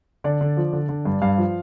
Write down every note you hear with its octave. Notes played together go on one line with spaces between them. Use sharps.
D3 D5
D3
F3
D3
D3
G2
G2 F5
F3